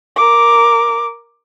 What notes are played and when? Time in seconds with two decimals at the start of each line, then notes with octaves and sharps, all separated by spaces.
0.16 A#4 D6